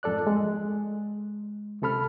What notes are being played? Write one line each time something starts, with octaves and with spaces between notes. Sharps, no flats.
F2 G#2 A4 D5 F#6
G#3
C#2 C3 A4 B5 F6